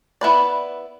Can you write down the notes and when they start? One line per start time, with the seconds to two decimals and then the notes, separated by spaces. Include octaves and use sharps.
0.21 B3 E4 B4 D5